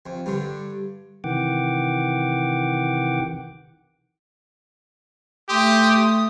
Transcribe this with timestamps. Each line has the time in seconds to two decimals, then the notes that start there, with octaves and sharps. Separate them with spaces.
0.06 F2
0.26 G2 D3
1.24 C3 D#3 E3 F#5 G5 D6
5.49 A3 G4 C6 D#6